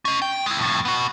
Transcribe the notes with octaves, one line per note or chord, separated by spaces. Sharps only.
C#4 D#5
G5
G#3 E4
F2 A2
B3 F#4